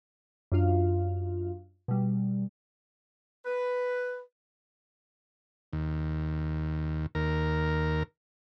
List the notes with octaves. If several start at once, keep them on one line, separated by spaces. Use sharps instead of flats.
F#2 D4 F4 F5
B2 G3
B4
D#2
D#2 A#4